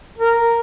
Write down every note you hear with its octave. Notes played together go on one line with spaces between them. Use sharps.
A#4